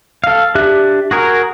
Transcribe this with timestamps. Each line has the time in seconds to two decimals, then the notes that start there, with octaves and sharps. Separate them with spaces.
0.24 A4 F5
0.55 D4 G4 E5 F#6
1.11 F#4 G#4 A#4